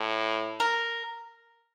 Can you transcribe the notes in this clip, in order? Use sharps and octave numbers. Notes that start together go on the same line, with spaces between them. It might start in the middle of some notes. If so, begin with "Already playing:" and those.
Already playing: A2
A#4